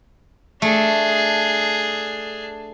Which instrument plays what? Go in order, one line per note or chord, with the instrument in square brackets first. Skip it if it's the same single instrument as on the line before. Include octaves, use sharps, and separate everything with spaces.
[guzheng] A3 [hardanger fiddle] D4 G#4